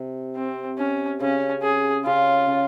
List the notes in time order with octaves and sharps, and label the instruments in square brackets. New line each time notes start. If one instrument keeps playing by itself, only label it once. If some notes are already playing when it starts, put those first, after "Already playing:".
Already playing: [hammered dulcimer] C3
[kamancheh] C4
C#4
[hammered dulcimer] C#3 [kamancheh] C#4
[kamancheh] G#4
[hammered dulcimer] C#3 [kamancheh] F4
[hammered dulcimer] C#3